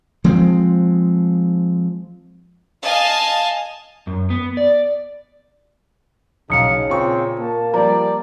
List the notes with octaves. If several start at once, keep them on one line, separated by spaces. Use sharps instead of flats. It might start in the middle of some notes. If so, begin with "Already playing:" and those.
F3 G#3 C4
D#5 F5 G#5 A5
F#2
B3
D5
B1 C#3 D#4 F5 D#6 C#7
A#2 C4 C#6
A#3 A5
F3 G3 D5 A#5